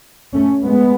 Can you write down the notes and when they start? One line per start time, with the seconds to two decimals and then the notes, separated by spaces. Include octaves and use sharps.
0.33 A3 C#4
0.64 G#3 B3